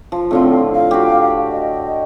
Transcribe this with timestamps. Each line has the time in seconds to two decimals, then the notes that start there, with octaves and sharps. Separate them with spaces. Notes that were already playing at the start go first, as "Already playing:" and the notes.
0.12 F3
0.31 A2 D3 C4 F4
0.74 F5
0.91 F#4 G4
1.51 D#5